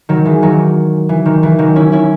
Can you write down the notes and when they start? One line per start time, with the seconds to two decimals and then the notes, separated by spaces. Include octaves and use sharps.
0.09 D#3 F#3
0.25 E3 G#3
0.42 D#3 F#3
1.09 E3
1.26 D#3
1.43 E3
1.59 D#3 F#3
1.76 C#4 E4
1.92 C#4 E4